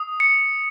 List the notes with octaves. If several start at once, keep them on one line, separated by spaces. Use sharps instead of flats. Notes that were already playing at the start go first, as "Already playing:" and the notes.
Already playing: D#6
C#7